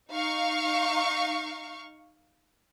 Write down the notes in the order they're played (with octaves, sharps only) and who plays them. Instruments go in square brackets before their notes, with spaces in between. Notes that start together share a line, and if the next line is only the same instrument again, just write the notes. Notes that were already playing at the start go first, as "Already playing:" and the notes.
[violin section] D#4 F5 C#6